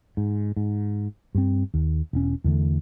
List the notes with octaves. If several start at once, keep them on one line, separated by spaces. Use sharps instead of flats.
G#2
G#2
G2 C4
D#2
E1 C#4
E2 D3 A3